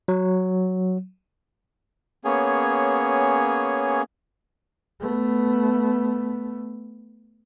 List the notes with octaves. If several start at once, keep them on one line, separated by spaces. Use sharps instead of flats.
F#3
A#3 B3 C#4 G#4 C#5 G#5
A3 B3